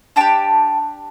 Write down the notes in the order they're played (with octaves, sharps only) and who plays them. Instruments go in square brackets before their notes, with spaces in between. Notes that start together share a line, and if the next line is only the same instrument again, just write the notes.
[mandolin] D4 G4 G5 A5